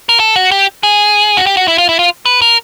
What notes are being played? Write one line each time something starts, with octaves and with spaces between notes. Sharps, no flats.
A#4
A4
F#4
G4
G#4
F#4
G4
F#4
E4
F4
E4
F4
B4
A#4